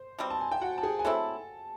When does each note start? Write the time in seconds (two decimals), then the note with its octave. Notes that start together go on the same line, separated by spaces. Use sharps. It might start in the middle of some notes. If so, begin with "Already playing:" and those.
Already playing: C5 C6
0.19 B2 G3 C4
0.30 A5
0.41 G#5
0.51 G5
0.61 F#4 F#5
0.78 A5
0.83 G#4 G#5
0.99 G#5
1.05 F#3 A3 C4 E4 A4 A5